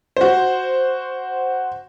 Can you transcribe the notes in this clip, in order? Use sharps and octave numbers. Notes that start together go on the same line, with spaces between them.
F#4 C5